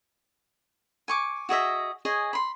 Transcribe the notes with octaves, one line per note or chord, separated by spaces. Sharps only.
G#5 C#6 D6
F#4 G#4 D#5 E5
G#4 C#5 D#5 G#5
B5 C6